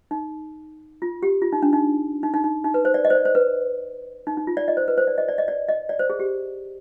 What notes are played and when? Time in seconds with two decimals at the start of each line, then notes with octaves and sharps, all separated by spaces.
0.11 D#4
1.02 F4
1.23 G4
1.42 F4
1.53 D#4
1.62 D4
1.73 D#4
2.23 D#4
2.34 D#4
2.44 D#4
2.64 D#4
2.74 B4
2.85 C5
2.94 D5
3.05 D#5
3.10 C5
3.15 D5
3.25 C5
3.35 B4
4.27 D#4
4.37 D#4
4.47 F4
4.57 D5
4.68 D#5
4.77 C5
4.88 B4
4.98 C5
5.07 D5
5.18 D#5
5.29 D5
5.38 D#5
5.48 D5
5.69 D#5
5.89 D5
5.99 C5
6.10 G#4
6.19 G4